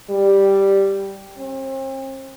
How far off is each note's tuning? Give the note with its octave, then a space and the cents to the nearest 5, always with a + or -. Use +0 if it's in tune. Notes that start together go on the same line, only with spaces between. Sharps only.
G3 +0
C4 +40